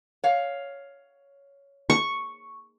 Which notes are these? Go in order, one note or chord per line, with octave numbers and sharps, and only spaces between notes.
C#5 F5
C#6